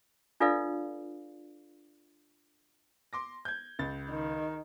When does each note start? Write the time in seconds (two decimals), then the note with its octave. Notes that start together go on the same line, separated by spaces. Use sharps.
0.40 D4 F4 A4 B4 D5 F5
3.13 C6 D6 A#6
3.45 G6 G#6
3.79 C#2 A6
4.10 D#3